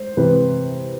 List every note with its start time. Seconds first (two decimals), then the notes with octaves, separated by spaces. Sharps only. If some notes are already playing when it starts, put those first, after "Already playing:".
Already playing: C5
0.17 C3 E3 B4